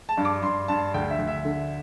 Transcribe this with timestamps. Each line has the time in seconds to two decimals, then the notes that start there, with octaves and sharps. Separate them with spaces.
0.09 A5
0.17 G2
0.25 D6
0.43 G2 C6
0.68 G2 A5
0.94 D2 G5
1.10 E5
1.19 D2
1.28 E5
1.45 D3